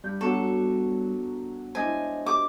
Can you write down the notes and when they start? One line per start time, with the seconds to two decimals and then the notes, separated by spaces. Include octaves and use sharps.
0.04 G2 G3 B5 G6
0.21 F#3 B3 D4 F#4 A4 C#6
1.75 G#3 D4 E4 C5 D#5 G#5
2.26 G4 D6